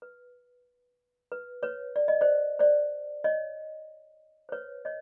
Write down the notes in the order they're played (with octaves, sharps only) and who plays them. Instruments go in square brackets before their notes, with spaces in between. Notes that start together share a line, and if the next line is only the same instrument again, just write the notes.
[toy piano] B4
B4
B4 C#5
D5
D#5
C5 D5
C5 D5
C#5 D#5
C5
B4 C#5
C#5 D#5